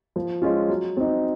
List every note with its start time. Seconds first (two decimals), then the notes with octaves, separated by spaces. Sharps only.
0.16 F3
0.42 G#3 C#4 F4
0.69 F#3
0.97 C4 D#4